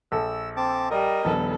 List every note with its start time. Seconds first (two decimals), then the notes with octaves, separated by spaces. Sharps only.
0.12 A#1 A4 E6
0.57 C4 A5 D6
0.91 G3 A#4 D#5
1.25 D#1 A#1 B3 A4